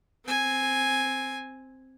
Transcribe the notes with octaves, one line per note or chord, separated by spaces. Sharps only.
C4 G#5